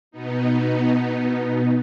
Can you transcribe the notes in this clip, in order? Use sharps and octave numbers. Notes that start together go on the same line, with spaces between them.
B2 B3 D#4